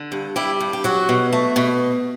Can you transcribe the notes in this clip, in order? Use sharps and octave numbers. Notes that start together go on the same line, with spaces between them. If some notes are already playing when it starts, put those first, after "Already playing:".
Already playing: D3
G2
G3 E4
G2
G4
F#3 F#4
B2
A3
B2